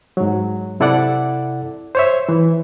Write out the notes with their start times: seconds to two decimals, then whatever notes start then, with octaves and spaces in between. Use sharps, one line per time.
0.17 G#2 F#3
0.80 C3 E4 A4 D5 F#5 D6
1.95 C5 C#5 E5
2.29 E3